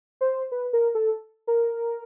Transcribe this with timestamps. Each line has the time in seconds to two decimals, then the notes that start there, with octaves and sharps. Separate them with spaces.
0.21 C5
0.52 B4
0.73 A#4
0.95 A4
1.47 A#4